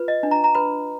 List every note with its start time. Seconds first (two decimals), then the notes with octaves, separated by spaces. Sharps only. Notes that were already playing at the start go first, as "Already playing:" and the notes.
Already playing: F4 B4
0.08 D#5
0.23 D4
0.31 A#5
0.44 A#5
0.55 B4 B5